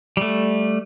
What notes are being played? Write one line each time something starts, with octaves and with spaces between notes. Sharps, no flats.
G3 A3